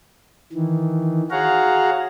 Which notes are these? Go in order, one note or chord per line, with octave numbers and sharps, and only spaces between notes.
D#3 E3
F#4 G#4 C#5 F5 F#5 A#5